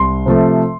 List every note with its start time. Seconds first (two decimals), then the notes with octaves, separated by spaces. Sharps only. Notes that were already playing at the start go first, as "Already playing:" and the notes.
Already playing: C2 C6
0.26 C3 F3 A3